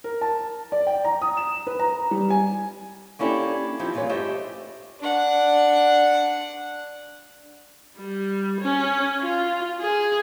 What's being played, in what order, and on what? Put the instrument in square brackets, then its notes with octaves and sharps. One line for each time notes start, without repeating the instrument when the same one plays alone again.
[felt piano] A#4
A5
D5
G5
A#5
D#6
E7
B4
A#5
G3
G#5
[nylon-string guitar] A#3 C#4 D4 E4 G4 A4
F3 C4 D#4 E4 G4
G2 E3 F4 G#4 C#5
A3 G4 C5 D#5 E5
[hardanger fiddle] D4 F#5
[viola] G3
C#4
F4
G#4